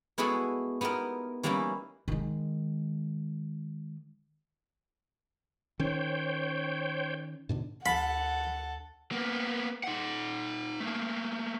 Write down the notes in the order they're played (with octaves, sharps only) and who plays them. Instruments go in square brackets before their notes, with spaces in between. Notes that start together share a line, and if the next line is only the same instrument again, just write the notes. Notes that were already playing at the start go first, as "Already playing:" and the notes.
[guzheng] G#3 B3 E4 F#4 G#4 A4
B3 D#4 E4 G4 A#4
E3 G3 A#3 C#4 D#4 E4
[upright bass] D#3 G#3
[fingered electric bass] D#3 C#4 [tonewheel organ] C5 C#5 G5
[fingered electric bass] G#2 B2 D3
[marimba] D2 [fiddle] A4 [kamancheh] F#5 [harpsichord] B5
[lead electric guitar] A#3 B3
D#4 F#5
A3 A#3